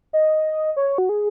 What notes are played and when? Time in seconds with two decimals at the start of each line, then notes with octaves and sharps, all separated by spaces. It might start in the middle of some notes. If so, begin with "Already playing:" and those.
0.13 D#5
0.77 C#5
0.98 F#4
1.09 G#4